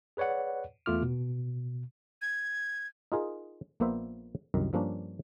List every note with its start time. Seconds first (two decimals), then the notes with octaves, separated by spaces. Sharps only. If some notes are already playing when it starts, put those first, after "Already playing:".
0.17 G#4 B4 C#5 D5 F#5
0.86 E2 A3 F4 D6 F6
1.03 B2
2.22 G#6
3.12 D#4 F4 G#4 A#4
3.80 A#1 A#2 A#3 B3 C5 E5
4.54 C2 F#2 D#3
4.73 G2 F3 A#3 C#4 D4